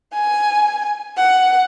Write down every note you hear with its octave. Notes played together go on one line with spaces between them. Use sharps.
G#5
F#5